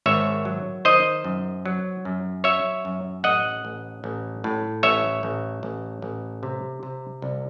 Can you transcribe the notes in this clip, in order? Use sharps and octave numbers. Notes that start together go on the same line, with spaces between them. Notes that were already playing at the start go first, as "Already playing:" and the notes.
G#1 C#5 E5
F#3
D#3 C5 D#5
F#2
F#3
F#2
F#3 C#5 E5
F#2
A1 D#5 F#5
A1
A1
A2
A1 C#5 E5
A1
A1
A1
C3
C3
C2